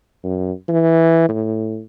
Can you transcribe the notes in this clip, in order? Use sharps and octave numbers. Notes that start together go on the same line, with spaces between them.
F#2
E3
A2